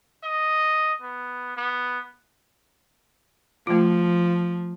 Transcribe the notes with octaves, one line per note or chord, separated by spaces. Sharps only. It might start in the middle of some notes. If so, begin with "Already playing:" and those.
D#5
B3
B3
F3 A3 F4